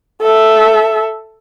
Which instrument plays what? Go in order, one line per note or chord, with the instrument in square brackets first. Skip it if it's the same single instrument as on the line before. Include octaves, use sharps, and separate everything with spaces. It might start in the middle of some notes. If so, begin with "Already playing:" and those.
[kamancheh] A4 E5